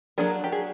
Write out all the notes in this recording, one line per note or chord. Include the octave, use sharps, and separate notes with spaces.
F#3 A#3 D4 G#4 A#4
G4
G#4